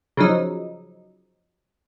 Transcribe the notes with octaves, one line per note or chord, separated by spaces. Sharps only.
C#3 F3 F#3 D#4